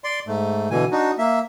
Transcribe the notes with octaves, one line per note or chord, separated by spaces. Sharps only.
D5 C6
G#2 A3
B2 D3 E3 G#5
D4 D#4 F#4
A#3 E5